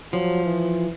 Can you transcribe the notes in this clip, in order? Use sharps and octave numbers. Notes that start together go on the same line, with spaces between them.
F3 F#3
E3